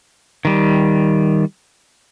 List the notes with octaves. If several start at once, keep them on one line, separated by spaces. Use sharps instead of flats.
D#3 G3